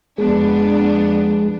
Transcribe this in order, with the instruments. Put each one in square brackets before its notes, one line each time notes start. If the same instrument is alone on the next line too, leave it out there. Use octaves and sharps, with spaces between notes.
[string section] F2 B3 D4 [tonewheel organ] G#3